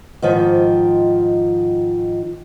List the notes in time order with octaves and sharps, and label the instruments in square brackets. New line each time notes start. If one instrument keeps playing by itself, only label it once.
[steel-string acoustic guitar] G#2 D#3 F3